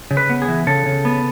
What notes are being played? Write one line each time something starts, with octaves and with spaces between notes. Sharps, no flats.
C#3
B4
B3
G#4
E3
C#3 A4
C#3
B3